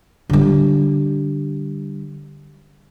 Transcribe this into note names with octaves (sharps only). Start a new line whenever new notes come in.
D3 G3